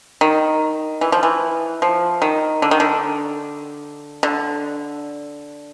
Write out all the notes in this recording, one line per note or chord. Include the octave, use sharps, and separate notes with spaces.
D#3
E3
F3
E3
F3
D#3
D3
D#3
D3
D3